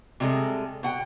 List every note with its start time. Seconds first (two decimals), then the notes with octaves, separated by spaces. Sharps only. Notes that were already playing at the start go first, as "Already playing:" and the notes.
0.20 C3 G3 G#3 G#4 A4
0.83 B2 F#5 G5